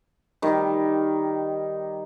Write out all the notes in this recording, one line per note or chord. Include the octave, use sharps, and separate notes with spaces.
D#3 G3